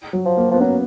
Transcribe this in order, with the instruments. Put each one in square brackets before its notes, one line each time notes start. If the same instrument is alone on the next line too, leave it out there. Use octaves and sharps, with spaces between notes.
[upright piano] F#3
[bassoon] F3
[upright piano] A#3
[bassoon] F3 [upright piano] B3
[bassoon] F#3 [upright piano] C#4